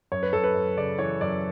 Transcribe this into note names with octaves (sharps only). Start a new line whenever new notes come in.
F#2 C#5
B4
F#2 A4
B4
F#2
C#3 D5
E3 C#5
F#2 D5